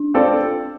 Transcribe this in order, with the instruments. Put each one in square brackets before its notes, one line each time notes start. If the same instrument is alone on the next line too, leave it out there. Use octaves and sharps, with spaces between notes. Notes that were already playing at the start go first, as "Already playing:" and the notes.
Already playing: [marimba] D4
[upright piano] C4 F4 A4 D5